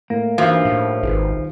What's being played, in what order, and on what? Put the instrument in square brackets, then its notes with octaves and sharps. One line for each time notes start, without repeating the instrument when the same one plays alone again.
[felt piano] A2 [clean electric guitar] A#3
[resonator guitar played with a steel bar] G2 F3 [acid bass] E3 [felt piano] D4 D#4 F#4
[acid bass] A2
[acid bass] G#1 [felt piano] D#3 G#4 B4